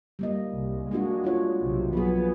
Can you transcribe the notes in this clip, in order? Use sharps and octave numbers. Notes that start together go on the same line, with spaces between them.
G3 A#3 D#5
C2
G#3 A#3 D4 F#4
D4 F4 C#5
B1 C3
F3 F#3 B3 G#4